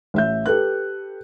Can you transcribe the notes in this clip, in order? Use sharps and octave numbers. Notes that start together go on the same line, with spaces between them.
A1 E5 G6
G4 A4 B4 F#6